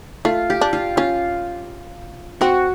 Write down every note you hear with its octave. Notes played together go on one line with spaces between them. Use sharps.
A3 F4
G4
D4
F4
C#4 F4
C4 F#4